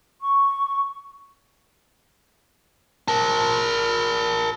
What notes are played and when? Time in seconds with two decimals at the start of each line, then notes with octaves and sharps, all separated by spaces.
0.21 C#6
3.08 A#4 A5